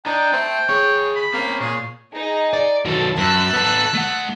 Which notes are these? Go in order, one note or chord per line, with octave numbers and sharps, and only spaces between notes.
D4 D#4 D5 G5
C4 E5 A5
D2 G#4 C#5
B5
A#3 C4 C#4
A#2 G#4 C#5
D#4 G#4
D5
D#3 F#3 A4
F#2 A5 E6 F#6
B3 A4
A3 F#5